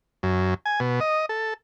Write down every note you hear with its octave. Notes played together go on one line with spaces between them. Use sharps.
F#2
G#5
B2
D#5
A4